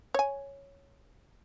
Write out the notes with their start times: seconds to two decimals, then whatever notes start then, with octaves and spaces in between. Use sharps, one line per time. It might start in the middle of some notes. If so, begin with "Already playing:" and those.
0.14 C#5 G#5